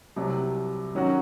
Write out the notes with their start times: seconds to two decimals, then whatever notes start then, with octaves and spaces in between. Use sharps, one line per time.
0.16 C2 C3 F#3
0.95 D#3 F#3 C#4 F#4 A#4